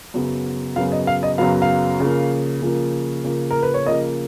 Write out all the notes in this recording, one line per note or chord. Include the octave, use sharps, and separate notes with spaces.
F#2 C#3 F#3 B3
F#2 C#3 F#3 B3 F5
D#5
F5
D#5
F#2 C#3 F#3 B3 F5
F5
C#3 F3 A#3
C#3 F3 A#3
C#3 F3 A#3
A#4
B4
C#5
C#3 F3 A#3 D#5